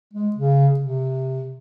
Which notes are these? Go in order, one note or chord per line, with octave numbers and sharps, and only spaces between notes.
G#3
C#3
C3